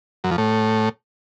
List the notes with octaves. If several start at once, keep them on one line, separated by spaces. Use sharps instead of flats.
F#2
F2
A2